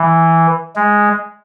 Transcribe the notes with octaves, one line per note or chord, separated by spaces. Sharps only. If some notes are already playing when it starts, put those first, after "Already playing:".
Already playing: E3
G#3